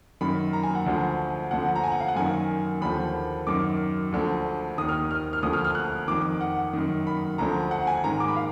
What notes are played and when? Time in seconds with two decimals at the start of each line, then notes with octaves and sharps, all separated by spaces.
0.21 F#2 D#3 B5
0.53 A#5
0.63 G#5
0.75 F#5
0.86 D2 D3 F3
1.51 D2 D3 F3 F#5
1.75 A#5
1.84 G#5
1.92 F#5
2.00 F5
2.08 F#5
2.16 F#2 D#3 G#5
2.81 D#2 D3 F3 B5
3.47 F#2 D#3 D6
4.12 D2 D3 F3
4.78 D#3 D#6
4.81 D#2
4.89 F6
5.11 F6
5.33 F6
5.42 D2 D3 F3 D#6
5.53 F6
5.65 F6
5.75 F#6
6.08 F2 D#3 D6
6.41 F#5
6.73 F#2 D#3
7.07 B5
7.38 D2 D3 F3 A#5
7.71 F#5
7.87 G#5
8.04 G#2 D#3 A#5
8.20 D6
8.28 B5
8.36 F5